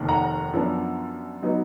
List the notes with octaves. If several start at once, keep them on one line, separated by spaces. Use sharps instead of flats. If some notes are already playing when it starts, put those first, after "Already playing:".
Already playing: F1 D#2 D#3
F#5 A#5
F#2 F3 B3 D4
F#3 B3 D#4